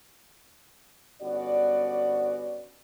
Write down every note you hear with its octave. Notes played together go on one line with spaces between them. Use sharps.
G1 B3 C#4 F#4 D5